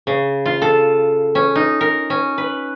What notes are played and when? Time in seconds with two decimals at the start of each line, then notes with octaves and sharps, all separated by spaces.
0.07 C#3
0.46 F4
0.62 A4
1.35 C#4
1.55 D#4
1.81 A#4
2.10 C#4
2.38 B4